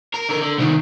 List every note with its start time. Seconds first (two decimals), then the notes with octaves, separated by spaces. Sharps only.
0.14 A#4
0.29 D3 A#4
0.42 D3
0.58 C2 D#3